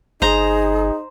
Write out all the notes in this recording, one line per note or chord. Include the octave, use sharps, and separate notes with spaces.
G1 D#4 G#4 C5 A#5